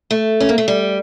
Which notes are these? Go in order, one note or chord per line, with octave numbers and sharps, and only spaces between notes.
A3
C#4
A#3
A3
G3